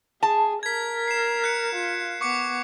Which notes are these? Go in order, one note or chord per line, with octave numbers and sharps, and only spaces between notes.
G#4 A5
A#4 G#6 B6
C7 E7
F#6 C#7
F4
B3 C#6 D6 C#7